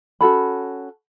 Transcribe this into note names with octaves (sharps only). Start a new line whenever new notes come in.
C#4 F#4 A4 B5